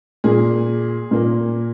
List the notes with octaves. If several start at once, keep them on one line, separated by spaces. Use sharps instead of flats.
A#2 A#3 G#4
A#2 A#3